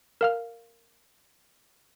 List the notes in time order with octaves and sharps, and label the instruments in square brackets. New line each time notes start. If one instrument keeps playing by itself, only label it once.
[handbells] A#4 F5 F6